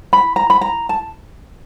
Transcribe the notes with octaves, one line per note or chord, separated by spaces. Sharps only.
B5
A#5
B5
A#5
A5